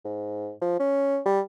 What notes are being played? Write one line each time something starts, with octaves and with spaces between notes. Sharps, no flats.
G#2
F3
C#4
G3